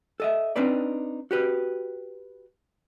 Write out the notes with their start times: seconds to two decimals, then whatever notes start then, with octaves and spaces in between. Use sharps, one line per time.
0.20 A4 D#5 E5
0.56 C4 D4 D#4 B4 D5
1.31 F#4 G4 B4